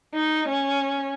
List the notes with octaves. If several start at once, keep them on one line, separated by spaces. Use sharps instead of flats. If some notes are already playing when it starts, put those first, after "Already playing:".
D#4
C#4